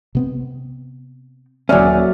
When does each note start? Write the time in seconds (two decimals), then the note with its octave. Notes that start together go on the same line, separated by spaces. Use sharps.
0.15 C3 B3 C4
1.69 D#1 F#3 C#4 D5 E5 G#5 F6